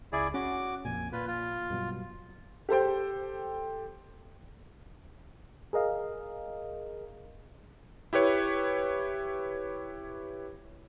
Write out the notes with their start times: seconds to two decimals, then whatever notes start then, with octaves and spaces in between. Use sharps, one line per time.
0.13 C#2 E4 G#4 D5
0.34 C#4 F#4 D6
0.85 A#1 F2 A#2 G#5
1.12 A#2 F4 B4
1.27 F4
1.70 G2 B2 F#3
2.69 G4 A4 C5 G5
5.73 G#4 A#4 D#5 F5
8.13 E4 G4 B4 C#5